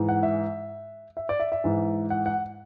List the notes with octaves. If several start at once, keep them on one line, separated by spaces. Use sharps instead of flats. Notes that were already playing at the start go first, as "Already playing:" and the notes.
Already playing: G#2 E3
F#5
E5
E5
D5
E5
E5
G#2 E3
F#5
F#5